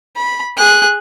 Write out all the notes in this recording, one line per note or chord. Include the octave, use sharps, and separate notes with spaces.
B5
G#4 F#6